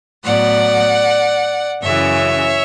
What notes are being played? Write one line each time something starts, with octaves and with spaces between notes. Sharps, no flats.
A2 F#3 B3 D5 F#5
F#2 C#3 E3 C#5 E5